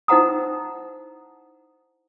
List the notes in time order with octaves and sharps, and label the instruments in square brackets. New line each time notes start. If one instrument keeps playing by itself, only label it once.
[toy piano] D#4 E4 C5 F#5 A#5 D#6